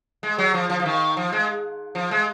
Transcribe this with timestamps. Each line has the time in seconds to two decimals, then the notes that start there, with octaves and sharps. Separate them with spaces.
0.23 G#3
0.38 F#3
0.54 F3
0.70 F3
0.80 F3
0.86 D#3
1.17 F3
1.32 G#3
1.95 F3
2.11 G#3